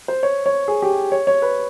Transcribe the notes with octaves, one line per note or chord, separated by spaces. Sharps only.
C5
C#5
C#5
G#4
G4
C#5
C#5
B4